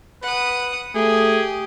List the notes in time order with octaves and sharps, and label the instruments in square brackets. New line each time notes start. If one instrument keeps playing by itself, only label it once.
[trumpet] B4 [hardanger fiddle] F#5 D#6
[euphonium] A3 [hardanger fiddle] G4 [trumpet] G#4